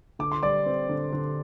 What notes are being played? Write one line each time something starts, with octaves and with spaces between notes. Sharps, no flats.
D3 D6
C6
G3 D5 D6
C4
D3
D3